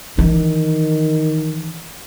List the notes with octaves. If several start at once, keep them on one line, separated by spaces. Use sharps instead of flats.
D#3 E3